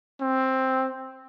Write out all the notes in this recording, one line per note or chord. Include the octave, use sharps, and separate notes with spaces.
C4